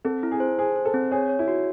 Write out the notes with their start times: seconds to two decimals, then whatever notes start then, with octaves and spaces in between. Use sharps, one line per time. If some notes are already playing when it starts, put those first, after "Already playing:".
0.05 C4 A4
0.23 E4
0.31 G#4
0.40 C5
0.58 G#4 C5
0.76 C5
0.85 A4
0.94 C4
1.11 G#4 C#5
1.29 C#5
1.39 E4
1.48 F#4